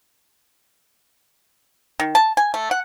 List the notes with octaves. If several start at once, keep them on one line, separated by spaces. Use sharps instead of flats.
D#3
A5
G#5
A3
F#5